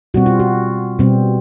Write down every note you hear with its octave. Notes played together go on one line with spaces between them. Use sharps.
B2 G3 C4 F#4
F4
F#4
B2 G3 C4